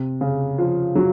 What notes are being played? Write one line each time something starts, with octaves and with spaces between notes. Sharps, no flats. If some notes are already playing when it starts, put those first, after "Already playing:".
Already playing: C3
C#3
F3
F#3